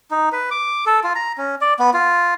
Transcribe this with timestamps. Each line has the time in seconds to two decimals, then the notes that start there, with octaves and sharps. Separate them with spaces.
0.11 D#4
0.32 B4
0.51 D6
0.86 A4
1.04 F4
1.15 A#5
1.38 C#4
1.61 D5
1.79 B3
1.94 F4